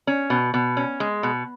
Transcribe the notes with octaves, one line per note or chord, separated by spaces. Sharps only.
C#4
B2
B2
C#4
G#3
B2